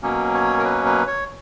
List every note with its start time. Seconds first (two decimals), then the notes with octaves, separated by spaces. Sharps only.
0.02 B2 F#3 A#3 C#4
0.34 C#5
0.58 A#4
0.65 B4
0.86 B4
1.07 C#5